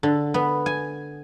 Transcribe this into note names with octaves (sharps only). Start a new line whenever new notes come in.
D3
B3
G#5